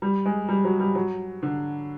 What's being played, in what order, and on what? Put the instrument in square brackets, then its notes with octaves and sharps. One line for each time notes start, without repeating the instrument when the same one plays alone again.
[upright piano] G3
G#3
G3
F#3
G3
F#3
D3